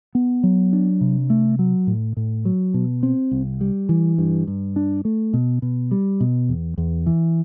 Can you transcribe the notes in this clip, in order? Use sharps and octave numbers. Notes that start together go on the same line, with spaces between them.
B3
F#3
D4
C3
A3
F#3
A2
A2
F#3
B2
C4
C2
G3
E3
G2
G2
D4
A3
B2
B2
G3
B2
E2
E2
E3